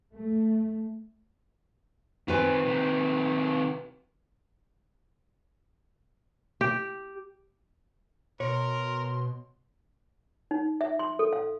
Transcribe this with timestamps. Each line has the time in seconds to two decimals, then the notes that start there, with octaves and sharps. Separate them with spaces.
0.15 A3
2.28 D#3 C4 F4 B4 G#5
2.65 C3 D#3
6.61 G4
8.40 B2 A#4 C#5 C6
10.51 D#4
10.81 E5
10.99 C6
11.19 A4
11.33 F5